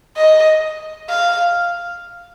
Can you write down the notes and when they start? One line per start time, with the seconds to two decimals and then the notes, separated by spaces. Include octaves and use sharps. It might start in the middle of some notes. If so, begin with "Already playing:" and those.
0.17 D#5
1.09 F5